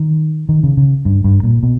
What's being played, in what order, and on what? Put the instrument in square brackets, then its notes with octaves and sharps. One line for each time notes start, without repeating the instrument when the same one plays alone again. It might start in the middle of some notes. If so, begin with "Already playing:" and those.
Already playing: [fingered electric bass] D#3
D#3
C#3
C#3
G2
G2
A#2
B2